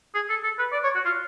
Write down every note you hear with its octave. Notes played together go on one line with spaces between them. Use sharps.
G#4
A4
A4
B4
D5
C#5
F#4
F4